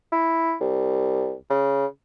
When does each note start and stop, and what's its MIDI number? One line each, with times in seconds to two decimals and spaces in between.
0.12 0.55 64
0.61 1.33 36
1.50 1.86 49